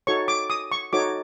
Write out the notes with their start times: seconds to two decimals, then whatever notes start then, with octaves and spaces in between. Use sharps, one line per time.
0.07 D#4 F#4 A4 C#5 C#6
0.28 D6
0.50 D#6
0.72 C#6
0.93 D#4 F#4 A4 C#5 D6